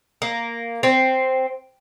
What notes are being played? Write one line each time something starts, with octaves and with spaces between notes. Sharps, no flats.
A#3
C4